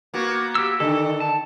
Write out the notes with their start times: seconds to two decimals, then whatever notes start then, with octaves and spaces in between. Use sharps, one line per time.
0.14 A#3 B3 F#4
0.55 G4 E6
0.80 D3 D#3 A4
1.20 A5